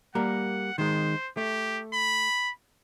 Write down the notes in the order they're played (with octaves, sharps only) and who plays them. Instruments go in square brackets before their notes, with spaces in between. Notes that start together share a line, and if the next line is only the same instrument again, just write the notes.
[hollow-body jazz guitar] G3 A#3 A#4 [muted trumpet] F#5
[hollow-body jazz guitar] D#3 G#3 [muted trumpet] C5
[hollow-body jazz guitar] A3 [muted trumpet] G4
[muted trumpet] B5